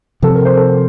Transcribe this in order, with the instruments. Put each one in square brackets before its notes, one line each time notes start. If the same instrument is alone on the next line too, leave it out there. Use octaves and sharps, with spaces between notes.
[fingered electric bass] C3 F3 C4 [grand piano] A4
[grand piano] A#4
C5
A4